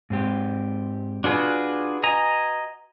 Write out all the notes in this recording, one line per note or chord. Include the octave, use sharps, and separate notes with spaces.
G#2 C4 G4
D4 F4 F#4 G#4 B4
D#5 G#5 A#5